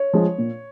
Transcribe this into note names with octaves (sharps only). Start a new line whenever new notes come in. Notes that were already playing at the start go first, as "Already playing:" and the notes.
Already playing: C#5
F3 G#3
A#2